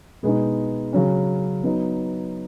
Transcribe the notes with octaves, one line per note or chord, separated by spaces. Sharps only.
B2 G#3 B3 D#4
C#3 F#3 C#4
F#3 B3 D#4